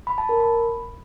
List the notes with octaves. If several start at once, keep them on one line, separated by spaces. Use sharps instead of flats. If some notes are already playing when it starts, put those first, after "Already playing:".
B5
A5
A#4
B5